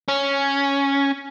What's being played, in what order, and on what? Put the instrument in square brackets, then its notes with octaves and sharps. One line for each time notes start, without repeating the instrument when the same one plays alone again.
[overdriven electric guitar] C#4